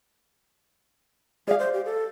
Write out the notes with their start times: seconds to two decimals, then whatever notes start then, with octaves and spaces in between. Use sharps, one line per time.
1.48 G#4 D5 F5
1.59 C5
1.73 G4
1.85 A4